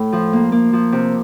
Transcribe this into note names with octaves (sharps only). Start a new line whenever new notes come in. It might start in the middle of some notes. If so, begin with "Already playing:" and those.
Already playing: A2
F3
A#3
A#3
F3
C3